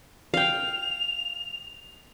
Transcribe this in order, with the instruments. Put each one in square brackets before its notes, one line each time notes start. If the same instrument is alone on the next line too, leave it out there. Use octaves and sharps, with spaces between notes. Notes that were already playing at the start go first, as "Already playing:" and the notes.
[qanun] F5 G5 [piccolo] F7